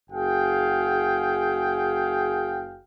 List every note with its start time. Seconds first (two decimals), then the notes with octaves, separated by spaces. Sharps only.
0.11 F#1 F#4 G#4 F5 G5